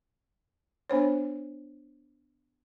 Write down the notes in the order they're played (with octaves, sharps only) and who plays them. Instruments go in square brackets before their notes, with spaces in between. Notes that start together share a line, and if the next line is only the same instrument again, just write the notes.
[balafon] B3 D4 C5 C#5